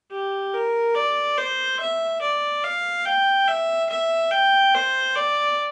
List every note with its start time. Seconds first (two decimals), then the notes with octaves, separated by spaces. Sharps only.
0.11 G4
0.54 A#4
0.95 D5
1.38 C5
1.80 E5
2.21 D5
2.64 F5
3.06 G5
3.47 E5
3.90 E5
4.31 G5
4.74 C5
5.15 D5